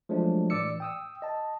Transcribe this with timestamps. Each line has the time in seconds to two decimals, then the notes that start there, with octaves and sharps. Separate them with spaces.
0.09 F3 F#3 G#3 A3 D4
0.50 A2 E3 D5 D6 E6 C#7
0.80 G5 D#6 E6
1.22 D#5 A5